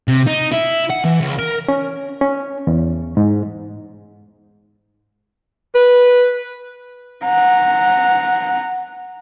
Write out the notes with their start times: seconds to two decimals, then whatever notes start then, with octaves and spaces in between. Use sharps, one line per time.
0.08 C3
0.28 D#4
0.53 E4
0.91 F#5
1.05 E3
1.21 C#2
1.39 A#4
1.68 C#4
2.21 C#4
2.67 E2
3.17 G#2
5.75 B4
7.25 F#5 A#5